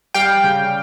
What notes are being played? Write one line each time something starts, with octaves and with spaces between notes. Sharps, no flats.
G3 F5 G5
C#3